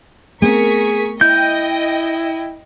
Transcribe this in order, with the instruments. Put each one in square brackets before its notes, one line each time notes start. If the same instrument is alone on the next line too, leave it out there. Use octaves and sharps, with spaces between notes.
[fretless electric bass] A3 B3 C4 [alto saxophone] G#4 [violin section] A#4 C#6 B6
[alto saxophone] E4 [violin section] D#5 G5 [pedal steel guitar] G6